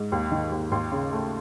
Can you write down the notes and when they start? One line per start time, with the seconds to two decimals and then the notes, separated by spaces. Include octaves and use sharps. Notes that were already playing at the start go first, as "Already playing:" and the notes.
Already playing: G#2
0.12 D#2
0.31 D#3
0.52 D#2
0.71 D#2 C6
0.92 C#3
1.12 A3